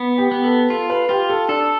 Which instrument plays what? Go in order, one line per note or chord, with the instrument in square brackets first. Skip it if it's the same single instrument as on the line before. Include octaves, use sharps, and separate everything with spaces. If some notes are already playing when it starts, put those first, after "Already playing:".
Already playing: [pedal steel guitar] B3
[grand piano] G4
[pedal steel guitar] B3
[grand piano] A4
[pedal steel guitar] F4 [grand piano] A4
[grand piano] B4
[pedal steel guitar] F4 [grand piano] G4
[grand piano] A4
[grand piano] D4 [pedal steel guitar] A4